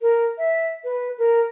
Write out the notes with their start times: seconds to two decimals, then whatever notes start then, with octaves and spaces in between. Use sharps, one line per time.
0.02 A#4
0.38 E5
0.84 B4
1.18 A#4